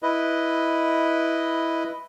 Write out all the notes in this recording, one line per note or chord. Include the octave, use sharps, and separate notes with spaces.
E4 B4 D#5